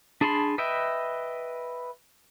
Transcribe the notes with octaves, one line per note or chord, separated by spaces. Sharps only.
D4 G#4 A5 B5 C6
B4 D#5 E5 G5